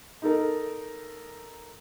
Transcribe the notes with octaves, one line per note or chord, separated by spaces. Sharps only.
D#4 A4 A#4